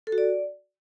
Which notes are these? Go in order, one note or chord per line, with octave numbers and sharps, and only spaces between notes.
A4
F#4
D5